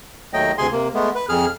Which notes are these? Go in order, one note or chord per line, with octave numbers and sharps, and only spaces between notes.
D#2 F#3 A3 D#5 G5
D2 C3 G#4 G#5 C6
C3 A#3
G#3 A3 B3
B4
F2 G#4 F6